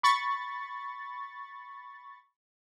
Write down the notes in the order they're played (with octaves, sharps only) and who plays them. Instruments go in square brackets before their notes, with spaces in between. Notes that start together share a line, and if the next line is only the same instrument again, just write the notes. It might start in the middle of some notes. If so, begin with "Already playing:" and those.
[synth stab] B5 C#6 A6